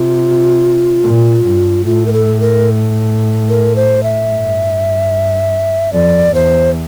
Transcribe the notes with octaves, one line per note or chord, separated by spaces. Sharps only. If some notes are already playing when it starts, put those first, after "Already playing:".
Already playing: C3 F4
A#2
G2
A2 F4
A#4
A4
A#4
A#4
C5
E5
G2
F2 D5
E2 C5